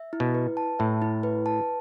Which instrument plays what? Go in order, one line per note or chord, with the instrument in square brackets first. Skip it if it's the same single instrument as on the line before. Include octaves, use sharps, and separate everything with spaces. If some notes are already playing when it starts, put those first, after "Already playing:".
Already playing: [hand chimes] E5
E4
[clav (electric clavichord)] B2
[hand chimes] B4
A5
[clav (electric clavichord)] A2 [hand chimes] E5
[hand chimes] E4
B4
A5